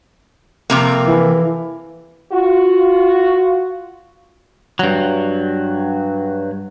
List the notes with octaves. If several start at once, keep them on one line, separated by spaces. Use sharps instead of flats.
F2 C3 A#3
E3
F4 F#4
G2 F#3